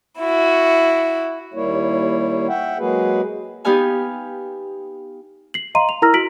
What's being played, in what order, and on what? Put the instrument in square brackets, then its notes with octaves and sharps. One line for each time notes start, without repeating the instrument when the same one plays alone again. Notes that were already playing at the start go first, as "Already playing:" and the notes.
[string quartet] E4 F#4
[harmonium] D#2 G3 A#3 E4 C#5
E5 F#5 G5
F#3 G#3 A#3 F#4 G#4 B4
[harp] B3 D#4 G4 B4 F5 G#5
[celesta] C7 F#7
D#5 F5 A#5 C6 D#7
F7
E4 A#4 A#5 E6 F6 A#6
F#4 B6 D7 F#7